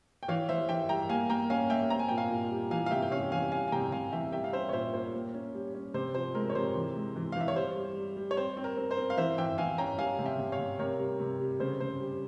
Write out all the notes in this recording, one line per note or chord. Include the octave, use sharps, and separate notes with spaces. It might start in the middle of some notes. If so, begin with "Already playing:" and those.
G5
E3 C#5 F5
E3 C5 E5
E3 E5 G5
G3 G5 A#5
A#3 F5 G#5
A#3 G5 A#5
C#4 F5 G#5
A#3 E5 G5
C4 A#5
G#5
A#2 G5
F5 G#5
A#2
G3
E3 F5 G#5
F5
C3 E5 G5
G5
C#4 C#5 F5
E3 F5 G#5
G3 F5 G#5
G#5
C3 G5 A#5
C3 F5 G#5
E3 E5 G5
G3 E5 G5
F5
C#4 C5 E5
C#5
A#2 C5 E5
A#2 C5
A#3
C#4
G3
C#4
C3 C5
F3 C5
G#3 A#4
C#5
C3 C5
E3
G#3
E3
F5
E3 E5
C#5
G3 C5
G3
G3
G3
C#5
C4 C5
C4
A#4
C4
C5
C4
F5
E3 C5 E5
E3 E5 G5
E3 F5 G#5
C#4 G5 A#5
G3 F5 G#5
C3
E5 G5
C3
C#5 F5
C3
C3 A#4 C#5
G3
C3
G3
C#3 C5
C#3 C5
G3